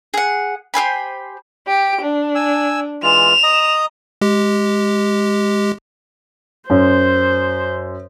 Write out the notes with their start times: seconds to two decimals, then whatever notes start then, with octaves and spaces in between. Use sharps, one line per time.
0.14 G#4 F#5
0.74 G4 C5 G#5 B5
1.67 G4 D7
2.02 D4
2.35 G#5 E6
3.03 E3 G#3 F4 E7 F7
3.43 D#5 A#5 D#6
4.21 G#3 G4
6.70 F#2 C5